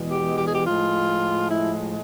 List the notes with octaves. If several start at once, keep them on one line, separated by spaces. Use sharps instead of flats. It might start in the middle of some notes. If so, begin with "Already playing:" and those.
Already playing: E2 B2 G#3
G4
G4
G#4
G4
A2 F3 G#3 F4
E4